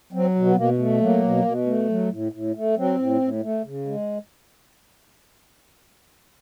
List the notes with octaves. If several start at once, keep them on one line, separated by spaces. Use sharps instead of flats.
F#3 C4
B2
B3
B2 A#3
A3
F#3 A#3
B2
B2
A3
F#3
A2
A2
A3
F#3 C4
A2
A2
A3
C#3
G#3